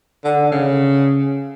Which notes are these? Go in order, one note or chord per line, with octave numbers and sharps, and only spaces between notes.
D3
D3
C#3